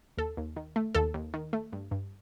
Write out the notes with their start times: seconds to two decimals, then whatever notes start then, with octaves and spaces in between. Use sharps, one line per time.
0.18 D#2 A4
0.37 D#2
0.56 D#3
0.76 A3
0.95 D#2 A4
1.14 D#2
1.34 D#3
1.53 A3
1.73 G2
1.91 G2